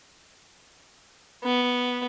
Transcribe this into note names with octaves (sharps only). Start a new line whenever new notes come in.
B3